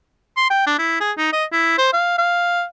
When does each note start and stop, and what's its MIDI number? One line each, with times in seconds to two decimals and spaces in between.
0.37 0.47 84
0.50 0.63 79
0.67 0.76 62
0.79 0.96 64
1.00 1.12 68
1.18 1.28 63
1.33 1.45 75
1.52 1.75 64
1.78 1.88 72
1.93 2.16 77
2.18 2.63 77